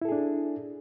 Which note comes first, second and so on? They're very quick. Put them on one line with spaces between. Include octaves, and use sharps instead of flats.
E4 A4 G#4 D4